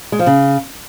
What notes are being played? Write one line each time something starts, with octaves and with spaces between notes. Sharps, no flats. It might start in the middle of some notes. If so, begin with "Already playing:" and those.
G#3
F3
C#3